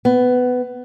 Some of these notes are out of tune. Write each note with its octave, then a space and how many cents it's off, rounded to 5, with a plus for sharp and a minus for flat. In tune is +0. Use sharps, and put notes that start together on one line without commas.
B3 +15